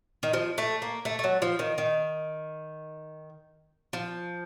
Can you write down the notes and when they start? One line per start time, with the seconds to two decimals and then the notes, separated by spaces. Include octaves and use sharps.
0.23 D#3
0.33 F3
0.58 A3
0.82 A#3
1.05 A3
1.19 A3
1.24 F#3
1.42 F3
1.59 D#3
1.78 D#3
3.93 F3